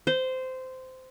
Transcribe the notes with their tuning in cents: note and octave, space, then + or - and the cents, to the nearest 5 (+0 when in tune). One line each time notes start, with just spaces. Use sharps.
C5 -15